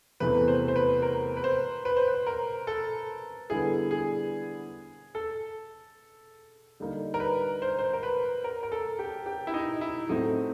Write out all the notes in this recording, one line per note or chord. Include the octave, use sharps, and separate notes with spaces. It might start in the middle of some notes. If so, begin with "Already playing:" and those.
E2 C3 E3 A3 C4 B4
C5
C5
B4
A#4
B4
C5
B4
C5
B4
A#4
A4
D3 G3 B3 E4 G#4
G#4
A4
D3 G3 A#3 D#4
A#4
B4
C5
C5
A#4
B4
A#4
A#4
A4
G4
G4
E4
D#4
E4
A2 F#3 A3 C4 D#4